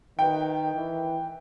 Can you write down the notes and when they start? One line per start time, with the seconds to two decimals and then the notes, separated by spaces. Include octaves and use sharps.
0.19 D#3 B4 G5
0.74 E3